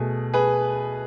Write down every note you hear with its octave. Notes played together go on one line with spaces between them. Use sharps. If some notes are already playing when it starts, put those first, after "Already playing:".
Already playing: B2 A3 G#4
G#4 B4